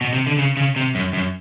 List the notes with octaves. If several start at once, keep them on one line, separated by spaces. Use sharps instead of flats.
B2
C3
D3
C#3
C#3
C3
F#2
F#2